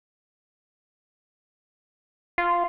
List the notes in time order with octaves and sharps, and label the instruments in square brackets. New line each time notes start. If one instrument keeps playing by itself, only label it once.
[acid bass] F4